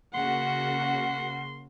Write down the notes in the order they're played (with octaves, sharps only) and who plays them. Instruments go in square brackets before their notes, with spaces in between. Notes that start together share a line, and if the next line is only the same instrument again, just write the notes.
[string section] C#3 A#3 F#4 [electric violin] F#5 [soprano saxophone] C6